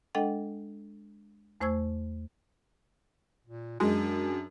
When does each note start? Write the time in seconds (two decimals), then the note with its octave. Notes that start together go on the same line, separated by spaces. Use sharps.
0.15 G#3 D4 A4 D#5 F#5 G5
1.60 E2 A3 C5 C#6 E6 G#6
3.46 A#2
3.80 F#2 G#3 D4 G#4